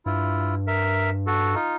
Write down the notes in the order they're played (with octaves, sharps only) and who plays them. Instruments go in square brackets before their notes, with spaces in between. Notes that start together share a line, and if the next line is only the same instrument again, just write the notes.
[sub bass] G2 [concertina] E4 F4
[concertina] A#4 E5
F#4 A4
D#4 F4